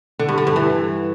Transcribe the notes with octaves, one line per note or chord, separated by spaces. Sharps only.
D3
G2
D3
G2
E3